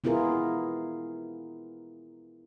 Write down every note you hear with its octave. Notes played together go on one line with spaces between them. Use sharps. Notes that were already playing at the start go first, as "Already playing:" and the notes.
B3 E4 F4 G#4 A#4